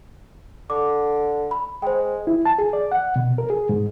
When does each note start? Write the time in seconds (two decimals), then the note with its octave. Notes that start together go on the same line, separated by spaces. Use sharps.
0.70 D3 D6
1.51 B5
1.82 G#3 C5 G5
2.27 E4
2.45 A5
2.59 G#4
2.73 D5
2.92 F#5
3.16 B2
3.38 A#4
3.50 G#4
3.69 G#2